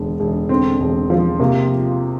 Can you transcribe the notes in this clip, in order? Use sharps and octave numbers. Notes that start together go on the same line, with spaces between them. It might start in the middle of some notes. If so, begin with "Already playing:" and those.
Already playing: E1 D3
E1
D3 C4
E1
F3
C3 A#3